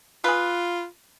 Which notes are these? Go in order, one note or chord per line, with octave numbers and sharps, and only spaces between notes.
F4 G#4 B4